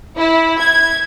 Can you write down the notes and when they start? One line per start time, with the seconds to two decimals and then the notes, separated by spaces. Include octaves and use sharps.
0.17 E4
0.59 G#6